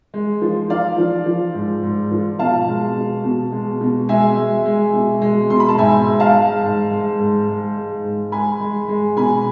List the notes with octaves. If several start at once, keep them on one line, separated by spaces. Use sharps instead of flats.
G#3
F3
F3 D5 F5
F3
F3
G#2
G#2
F3
B2 F5 A5
G#3
B2
B2
G#3
B2
G#3 E5 G#5
G#3
G#3
B2
G#3
B2 C6
B5
A5
G#2 E5 G#5
G#2
F5 A5
G#3
G#2
G#3
G#2
G#3
G#3
G#2
G#3 G#5 B5
G#3
G#3
B2 G#5 B5